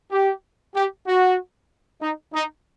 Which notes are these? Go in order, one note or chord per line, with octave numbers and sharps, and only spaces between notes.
G4
G4
F#4
D#4
D#4